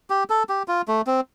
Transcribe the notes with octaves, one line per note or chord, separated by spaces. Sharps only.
G4
A4
G4
F4
A3
C4